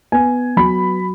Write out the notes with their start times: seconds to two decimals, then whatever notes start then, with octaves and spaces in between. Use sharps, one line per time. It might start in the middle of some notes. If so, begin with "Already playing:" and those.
0.12 B3 G#5
0.57 F#3 B5